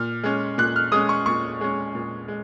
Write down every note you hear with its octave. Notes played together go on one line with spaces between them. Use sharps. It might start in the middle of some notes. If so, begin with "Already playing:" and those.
Already playing: A#2 F6
G#3 C#4
A#2 F#6
F6
G#3 C#4 D#6
C#6
A#2 C#6
G#3 C#4
A#2
G#3